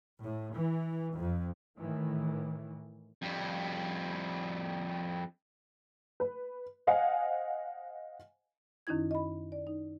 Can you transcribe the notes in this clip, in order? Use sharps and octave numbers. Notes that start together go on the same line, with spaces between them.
A2
E3
F2
A2 D#3 E3
F2 G3
B4
C5 D#5 F5 F#5 G#5
F#2 D#3 C#4 D#4 E4 G#6
D#5 B5
D5
D#4